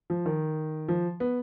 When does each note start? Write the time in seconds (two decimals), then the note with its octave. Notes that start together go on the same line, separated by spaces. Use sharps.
0.10 F3
0.26 D#3
0.88 F3
1.20 B3